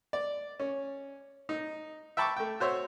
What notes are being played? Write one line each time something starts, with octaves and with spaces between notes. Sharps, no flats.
D5
C#4
D#4
E5 G5 A5 B5 C#6 D6
A3 G5
F#4 C5 C#5 E5